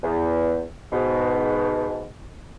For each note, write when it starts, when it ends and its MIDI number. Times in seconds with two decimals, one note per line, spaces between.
0.04 0.65 40
0.92 2.09 44
0.92 2.09 47